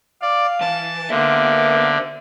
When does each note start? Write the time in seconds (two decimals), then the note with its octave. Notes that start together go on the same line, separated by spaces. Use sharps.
0.22 D5 F5
0.61 E3 A5
1.10 D3 A#3 B3 C5 E5